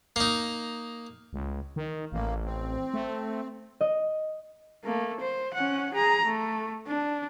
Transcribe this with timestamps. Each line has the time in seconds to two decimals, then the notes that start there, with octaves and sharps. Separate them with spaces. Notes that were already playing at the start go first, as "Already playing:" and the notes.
0.16 A#3 D#4
1.33 C#2
1.76 D#3
2.12 A1 A#3
2.45 C4
2.94 A3
3.81 D#5
4.84 A3 A#3
5.21 C5
5.54 C#4 F#5
5.94 G#4 A#5
6.26 A3
6.88 D4